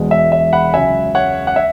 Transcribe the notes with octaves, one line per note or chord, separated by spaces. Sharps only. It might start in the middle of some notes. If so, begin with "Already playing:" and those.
Already playing: E1 E2 B2 G#3
E5
E5
F#5 B5
C#2 C#3 F#3 E5 G#5
C#5 F#5
F#5
E5